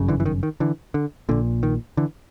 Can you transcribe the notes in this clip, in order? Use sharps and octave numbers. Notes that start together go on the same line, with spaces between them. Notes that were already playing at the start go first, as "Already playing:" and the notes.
Already playing: G1 F#2 C#3
D3 E3
E3
D#3
D#3
D3 E3
D3
A#1 A#2 D3
D#3
D3 E3